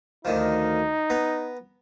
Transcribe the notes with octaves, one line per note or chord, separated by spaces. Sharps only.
D2 D#3 F3 D#4
B3 A#5